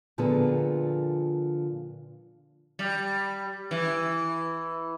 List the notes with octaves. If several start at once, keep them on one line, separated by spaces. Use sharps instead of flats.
A#2 D3 F3 B3 G#4
G3
E3